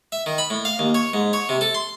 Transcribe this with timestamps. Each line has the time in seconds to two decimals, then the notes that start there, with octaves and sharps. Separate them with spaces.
0.12 E5
0.26 D#3
0.38 B5
0.50 A2
0.65 F5
0.79 D#2
0.94 C#5
1.14 G#2
1.33 C#5
1.49 C3
1.61 A4
1.74 C6